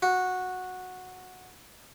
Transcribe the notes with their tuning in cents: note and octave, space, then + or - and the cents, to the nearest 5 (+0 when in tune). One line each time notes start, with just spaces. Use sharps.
F#4 -10